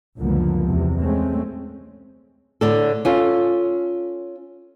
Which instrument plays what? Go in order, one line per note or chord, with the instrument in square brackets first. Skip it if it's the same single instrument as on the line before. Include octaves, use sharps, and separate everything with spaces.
[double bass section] C#2 F#2 D3 F3 A#3 B3
E2 C3
G#3 A3 C4 C#4
[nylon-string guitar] A2 D3 D4 A4
C#4 F4 A4